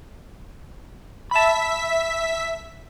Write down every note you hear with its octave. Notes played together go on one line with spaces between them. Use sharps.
E5 A5 B5 B6